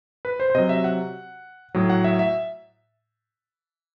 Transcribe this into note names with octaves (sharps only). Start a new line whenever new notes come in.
B4
C5
C5
C3 F#3 D#5
E5
F#5
A2 F#3
F#5
E5
E5